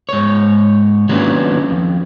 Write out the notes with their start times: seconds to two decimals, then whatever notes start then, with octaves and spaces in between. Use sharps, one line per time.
0.09 G#2 C#5
1.09 D#3 F#3 A#3 B3 C#4 D4
1.70 F2